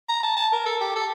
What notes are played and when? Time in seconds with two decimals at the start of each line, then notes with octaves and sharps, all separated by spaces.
0.09 A#5
0.23 A5
0.37 A5
0.52 A#4
0.66 A4
0.81 G4
0.96 A4